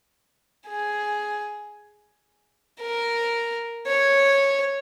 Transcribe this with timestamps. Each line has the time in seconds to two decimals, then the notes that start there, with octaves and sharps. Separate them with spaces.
0.68 G#4
2.81 A#4
3.87 C#5